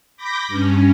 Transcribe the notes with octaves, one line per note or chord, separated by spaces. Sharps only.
B5 D6 G6 A#6
G2 C#4